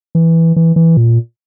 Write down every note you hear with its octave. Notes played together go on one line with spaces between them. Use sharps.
E3
E3
E3
A#2